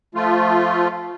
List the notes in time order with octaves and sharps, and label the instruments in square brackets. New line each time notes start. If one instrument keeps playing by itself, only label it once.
[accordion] F3 A3 F4